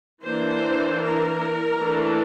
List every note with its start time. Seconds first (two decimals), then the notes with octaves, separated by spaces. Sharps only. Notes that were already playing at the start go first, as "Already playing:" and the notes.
0.25 E3 A#3 D4 C5
1.02 A#4
1.79 E3 A3 D4